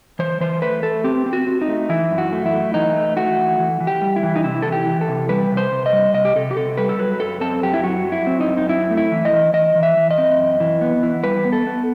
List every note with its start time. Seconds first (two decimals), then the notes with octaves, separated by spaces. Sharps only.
0.19 E3 C5
0.40 E3 C5
0.62 A3 B4
0.83 A3 A4
1.04 C4 G4
1.26 C4
1.33 F#4
1.47 C4
1.62 D#4
1.68 A3
1.89 E3 E4
2.11 F#2
2.18 F#4
2.33 A3
2.46 E4
2.53 A3
2.74 E3 D#4
2.96 A3
3.17 A3 F#4
3.38 E3
3.59 E3
3.80 E3
3.87 G4
4.02 G3
4.16 E4
4.23 E3
4.36 D#4
4.44 C3 E4
4.62 E3 A4
4.72 G4
4.86 E3
5.01 A4
5.08 C3
5.29 G3 B4
5.50 C3
5.57 C5
5.72 C3
5.86 D#5
5.93 G3
6.14 C3 D#5
6.25 G4
6.36 C3 A4
6.51 G4
6.56 C3 A4
6.77 G3 B4
6.89 A4
6.99 F#3 B4
7.20 F#2 A4
7.41 C4 A4
7.63 F#2 G4
7.74 E4
7.84 F#3 F#4
8.05 F#3
8.12 E4
8.27 C4
8.41 D#4
8.48 F#2
8.57 D#4
8.69 C4 E4
8.90 A3
8.97 E4
9.12 E3
9.25 D#5
9.32 E3
9.54 E3 D#5
9.75 E3
9.83 E5
9.97 E3
10.11 D#5
10.18 C4
10.38 F#2
10.60 E3
10.81 B3
11.03 E3
11.24 G3 B4
11.45 B3
11.52 A4
11.67 B3